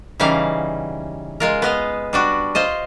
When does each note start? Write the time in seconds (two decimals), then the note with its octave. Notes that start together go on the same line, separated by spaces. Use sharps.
0.20 C#3 E3 G3 D#4 F5
1.40 G#3 F4 A#4
1.62 B3 D#5 F5
2.13 G3 D4 F#4
2.55 F4 C5 D#5